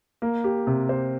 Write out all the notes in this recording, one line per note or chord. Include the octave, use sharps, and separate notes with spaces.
A#3
G4
C3
C5